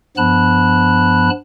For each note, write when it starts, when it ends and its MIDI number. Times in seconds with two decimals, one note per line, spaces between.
0.17 1.30 43
0.17 1.30 53
0.17 1.30 59
0.17 1.30 81
0.17 1.30 83
0.17 1.30 90